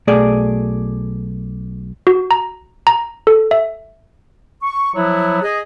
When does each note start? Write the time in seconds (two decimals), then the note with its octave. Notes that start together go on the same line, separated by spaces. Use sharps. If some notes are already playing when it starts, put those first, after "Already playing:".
0.07 B1 A3 G#4 D5
2.07 F#4
2.31 A#5
2.87 A#5
3.27 A4
3.51 E5
4.63 C#6
4.95 F3 F#3 B3 E4
5.42 G#4 D#5